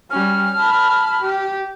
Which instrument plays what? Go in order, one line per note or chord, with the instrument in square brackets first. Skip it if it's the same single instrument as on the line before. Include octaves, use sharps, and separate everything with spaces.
[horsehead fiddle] G3 C#4 [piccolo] F6
[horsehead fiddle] A5 B5
G4